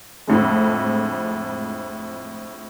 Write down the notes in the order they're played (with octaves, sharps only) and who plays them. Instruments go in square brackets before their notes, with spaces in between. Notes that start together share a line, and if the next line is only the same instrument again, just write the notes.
[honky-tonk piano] F2 A2 D3 G#3